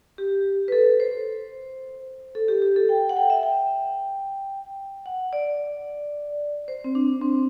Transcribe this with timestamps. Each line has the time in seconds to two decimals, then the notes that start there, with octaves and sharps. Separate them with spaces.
0.18 G4
0.68 B4
0.72 A4
1.00 C5
2.35 A4
2.48 G4
2.62 G4
2.76 A4
2.89 G5
3.09 F#5
3.17 G5
3.30 E5
3.43 G5
5.06 F#5
5.33 D5
6.68 C5
6.84 C4
6.95 D4
7.21 C4